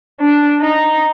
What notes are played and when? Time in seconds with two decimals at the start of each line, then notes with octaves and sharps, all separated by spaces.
0.21 D4
0.60 D#4